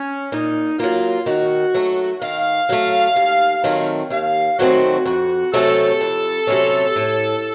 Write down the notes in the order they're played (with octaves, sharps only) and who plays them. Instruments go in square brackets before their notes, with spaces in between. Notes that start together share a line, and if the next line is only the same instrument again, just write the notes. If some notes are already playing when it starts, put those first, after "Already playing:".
Already playing: [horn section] C#4
[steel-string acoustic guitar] A#2 [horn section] D#4
[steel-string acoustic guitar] F#3 A#3 [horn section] F4
[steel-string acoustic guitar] D#3 [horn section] F#4
[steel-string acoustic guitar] F#3 A3
[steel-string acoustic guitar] D#3 [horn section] F5
[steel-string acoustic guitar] F#3 A3
D#2
D#3 F#3 A3 C4
[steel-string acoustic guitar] D#2 [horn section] F5
[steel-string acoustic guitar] D#3 F#3 A3 C4 [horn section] F#4
[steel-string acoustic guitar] F2 [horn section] F#4
[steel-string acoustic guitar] C3 F#3 A3 C#4 [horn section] A4
[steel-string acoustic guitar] F2
C3 F#3 A3 C#4
A2